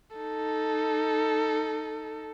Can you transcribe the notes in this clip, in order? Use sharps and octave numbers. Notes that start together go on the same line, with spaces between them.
D#4 A4